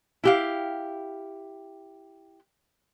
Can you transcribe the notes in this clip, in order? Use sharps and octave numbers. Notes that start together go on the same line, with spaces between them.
E4 G4 F5